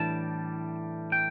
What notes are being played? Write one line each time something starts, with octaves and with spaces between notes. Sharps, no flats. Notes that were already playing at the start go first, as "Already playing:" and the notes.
Already playing: A2 E3 G3 D4 A5
G5